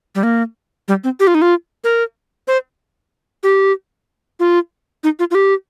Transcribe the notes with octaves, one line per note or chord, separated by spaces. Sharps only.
G3
A#3
G3
C4
G4
F4
D#4
F4
A#4
C5
G4
F4
D#4
F4
F4
G4